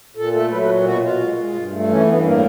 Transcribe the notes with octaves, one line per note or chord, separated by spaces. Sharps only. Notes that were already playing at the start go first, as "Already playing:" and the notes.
A#2 A4
A3 A4
F#3 B4
B4
A#2
B2 F#4
B2 F4
G#3
G#3
G2
A3
E3 C#4
G2 B3
A2 A#3